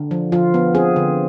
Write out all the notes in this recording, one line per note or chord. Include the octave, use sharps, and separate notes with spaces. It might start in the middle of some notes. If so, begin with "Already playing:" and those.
Already playing: D3
F3
F3 F4
B3
C4 G#4
D3